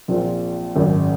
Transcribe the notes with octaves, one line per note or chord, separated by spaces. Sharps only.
A#1 A#2 C4
G#1 F#2 C#3